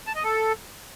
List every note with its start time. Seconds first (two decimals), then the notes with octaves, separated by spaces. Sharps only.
0.07 A5
0.15 D#5
0.24 A4